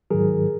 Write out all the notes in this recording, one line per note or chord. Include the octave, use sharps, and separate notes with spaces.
G#2 D#3 F#3 G#4 A#4